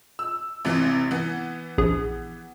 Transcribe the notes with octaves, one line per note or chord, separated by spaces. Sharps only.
E6
A1 C3 E3
E3 B3
A#1 G#4